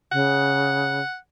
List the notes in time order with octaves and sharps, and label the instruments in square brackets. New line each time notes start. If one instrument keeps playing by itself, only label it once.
[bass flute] C#3 [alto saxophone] F#5